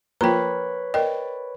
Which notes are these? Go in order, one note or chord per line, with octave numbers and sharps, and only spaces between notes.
F3 A#3 B4 C#5 G5 A#5 B5
A#4 D5 D#5 G5